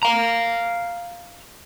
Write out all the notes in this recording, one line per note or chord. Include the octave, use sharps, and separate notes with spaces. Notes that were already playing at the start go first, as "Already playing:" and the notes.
F5 A#5